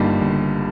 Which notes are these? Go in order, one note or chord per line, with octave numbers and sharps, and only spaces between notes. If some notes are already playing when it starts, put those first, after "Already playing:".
Already playing: G1 G2 G3 A#3 D#4 F4
G1